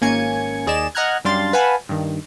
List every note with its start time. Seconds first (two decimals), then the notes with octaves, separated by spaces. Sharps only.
0.01 G#1 A#3 C#4 G#5 G#6 C#7
0.67 D#2 G#4 D5 D#5 E7
0.95 D#5 F#5 A#5 F6 F#6 G#6
1.24 F#2 G3 D4 F5 C6 A6
1.53 B4 F5 F#5 G#5 A5 B5
1.89 G2 D#3